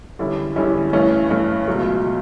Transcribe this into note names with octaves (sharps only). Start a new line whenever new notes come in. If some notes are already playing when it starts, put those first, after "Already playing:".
E2 D3 G3 C#4 E4
E2 D3 G3 C#4 E4
G2 E3 A3 C#4
G2 E3 A3 C#4
C#2 B2 F#3 A3
B2